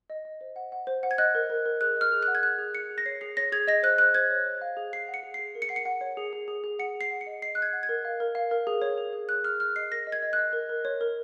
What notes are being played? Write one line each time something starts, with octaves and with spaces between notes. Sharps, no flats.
D#5
D#5
C5
F#5
F#5
C5
F#5
G#6
D#5 F#6
A#4
A#4
A#4
G#4 F#6
D#5 F6
G#4
F#6
F#5
G#6
G#4 F#6
G#4
G#4 C#7
G#4
A#6
C#5 C7
G#4 C7
C#5 A#6
G#4 G#6
D#5 A#6
C5 F#6
C5 F#6
C5 G#6
C#5
C#5
F5
G#4
G#4 C7
F#5
C#7
G#4
C7
G#4
A#4
C#7
F#5 C7
C#7
F#5
C#5
G#4
G#4
G#4
G#4
F#5 C#7
G#4
C7
F#5
C#7
D#5
D#5 C7
D#5 F#6
G#6
F#5
G#6
A#4
F5
A#4
F5
A#4
G#4
C#5
G#4
G#4
G#4 F#6
G#4 F6
G#4 F6
D#5 C7
A#4 A#6
D#5
G#6
D#5
F#6
D#5
A#4
A#4
C#5
A#4